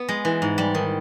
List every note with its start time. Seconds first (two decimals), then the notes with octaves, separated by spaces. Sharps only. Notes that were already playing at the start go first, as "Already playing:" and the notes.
Already playing: B3
0.09 G#3
0.25 E3
0.42 G#2
0.58 G3
0.75 D#3